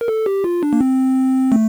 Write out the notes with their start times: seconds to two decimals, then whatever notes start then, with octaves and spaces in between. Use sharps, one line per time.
0.01 A#4
0.08 A4
0.26 G4
0.44 F4
0.63 D4
0.73 A#3
0.81 C4
1.52 A3